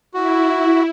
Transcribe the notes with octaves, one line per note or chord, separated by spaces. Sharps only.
E4 F#4